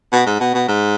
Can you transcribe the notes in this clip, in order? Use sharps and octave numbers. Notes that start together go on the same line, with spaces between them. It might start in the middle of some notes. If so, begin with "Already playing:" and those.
B2
G#2
B2
B2
G#2